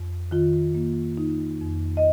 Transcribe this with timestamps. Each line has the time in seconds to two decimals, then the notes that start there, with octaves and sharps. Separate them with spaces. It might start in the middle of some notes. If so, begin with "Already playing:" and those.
Already playing: F2
0.31 D#3 F4
0.75 A#3
1.17 D#4
1.61 F2
1.97 D#5